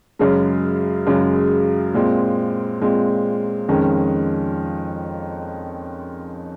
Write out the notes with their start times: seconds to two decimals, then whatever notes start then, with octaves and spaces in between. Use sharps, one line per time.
0.19 F#2 C#3 G#3
1.07 F#2 C#3 G#3
1.94 A#2 G#3 C4
2.81 A#2 G#3 C4
3.68 F2 D#3 G#3 C#4